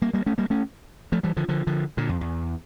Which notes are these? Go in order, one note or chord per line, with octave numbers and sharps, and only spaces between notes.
G3 A#3
G3 A#3
A3 C#4
G3 A#3
A3 C#4
F3 A3
E3 G3
D3 F3
D3 F3
D3 F3
A#2 D3
F2
E2